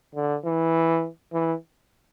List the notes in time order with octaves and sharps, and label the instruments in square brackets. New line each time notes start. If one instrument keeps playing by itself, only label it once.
[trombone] D3
E3
E3